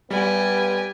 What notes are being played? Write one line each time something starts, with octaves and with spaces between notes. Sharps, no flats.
G3 B3 G4 G#5